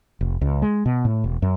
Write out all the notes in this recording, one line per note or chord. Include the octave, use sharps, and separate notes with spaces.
F1
C#2
G#3
B2
A2
E1
F#2